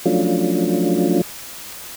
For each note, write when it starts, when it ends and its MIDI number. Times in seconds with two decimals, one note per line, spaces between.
0.05 1.21 53
0.05 1.21 54
0.05 1.21 57
0.05 1.21 61
0.05 1.21 62
0.05 1.21 65